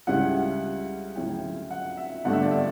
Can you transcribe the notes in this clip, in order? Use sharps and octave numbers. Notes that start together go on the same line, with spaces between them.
C#2 C#3 G3 C#4 E4 F#5
D2 C#3 F#3 C#4 E4 G5
F#5
E5
G1 G2 D3 A3 D4 F#5
E5
D5
E5